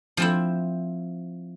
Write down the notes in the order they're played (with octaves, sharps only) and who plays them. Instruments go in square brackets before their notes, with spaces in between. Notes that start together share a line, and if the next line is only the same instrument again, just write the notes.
[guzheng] F3 C4 E4